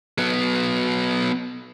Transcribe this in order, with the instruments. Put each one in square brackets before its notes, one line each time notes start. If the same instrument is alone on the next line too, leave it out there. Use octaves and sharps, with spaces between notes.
[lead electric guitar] F#3 B3